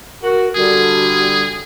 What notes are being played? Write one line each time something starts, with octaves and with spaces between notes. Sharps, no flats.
F#4 A#4
D3 G3 F#4 G#4